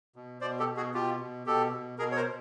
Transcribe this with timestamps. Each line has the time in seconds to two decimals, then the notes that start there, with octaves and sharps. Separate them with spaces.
0.16 B2
0.41 B2 C5 D5
0.59 G4 A4
0.67 B2
0.77 F#4 G#4
0.94 B2 F4 G4
1.20 B2
1.46 B2 G4 A4
1.73 B2
1.98 B2 G#4 A#4
2.12 C#5
2.16 A#4 C5
2.25 B2